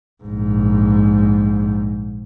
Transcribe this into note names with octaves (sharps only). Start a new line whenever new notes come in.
A#1 G#2